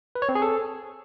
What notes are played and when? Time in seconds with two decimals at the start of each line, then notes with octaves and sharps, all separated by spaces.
0.15 B4
0.22 C#5
0.29 C4
0.35 G#4
0.42 A4